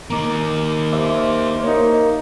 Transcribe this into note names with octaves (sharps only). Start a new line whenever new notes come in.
A#3 D#4 A#5 D6
G4 C5 E5 D6
A#3 D#4 C#5